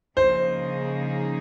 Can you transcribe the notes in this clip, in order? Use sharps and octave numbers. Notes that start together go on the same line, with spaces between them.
C#3 F3 A#3 D#4 G#4 C5